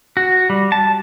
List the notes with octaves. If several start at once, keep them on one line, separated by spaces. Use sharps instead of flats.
F#4
G3
A5